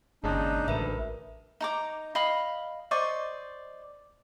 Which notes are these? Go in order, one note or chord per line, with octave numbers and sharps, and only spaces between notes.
G1 D#2 C#3 G#3 D4 D#4
A1 D2 A#4 B4 E5
D#4 A#5 D6
D#5 F5 B5
C5 D5 D#5 C#6